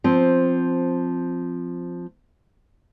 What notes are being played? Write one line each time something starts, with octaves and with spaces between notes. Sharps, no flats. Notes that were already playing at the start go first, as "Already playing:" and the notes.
F3 C4